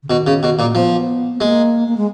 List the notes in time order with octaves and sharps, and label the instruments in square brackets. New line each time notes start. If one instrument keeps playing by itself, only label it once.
[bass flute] C#3
[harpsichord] B2 [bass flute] D#3
[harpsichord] C#3
B2
A#2
[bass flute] A#3
[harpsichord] F3 [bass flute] B3
[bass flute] B3
[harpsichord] G#3 [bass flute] A#3
[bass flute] A#3
G#3